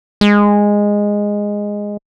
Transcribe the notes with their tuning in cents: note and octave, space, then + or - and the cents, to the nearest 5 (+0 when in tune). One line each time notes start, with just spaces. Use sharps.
G#3 -10